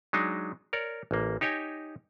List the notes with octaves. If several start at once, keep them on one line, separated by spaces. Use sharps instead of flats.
F#3 G#3 D4 D#4
A#4 C#5 D5
A1 A#3
D#4 G4 C#5 D#5 G#5